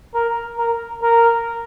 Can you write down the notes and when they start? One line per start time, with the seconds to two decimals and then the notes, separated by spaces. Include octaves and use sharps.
0.15 A#4
0.58 A#4
1.03 A#4